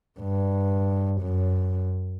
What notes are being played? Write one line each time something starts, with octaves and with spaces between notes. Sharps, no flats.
G2
F#2